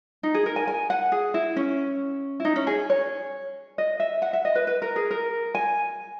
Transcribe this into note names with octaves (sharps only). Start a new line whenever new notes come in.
D#4
G#4
A#4
G#5
G#5
F#5
G#4
E4
C#4
E4
D#4
C#4
G#4
C#5
D#5
E5
F#5
E5
D#5
B4
B4
A#4
G#4
A#4
G#5